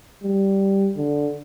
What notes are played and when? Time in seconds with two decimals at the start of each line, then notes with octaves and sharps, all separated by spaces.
0.24 G3
0.97 D3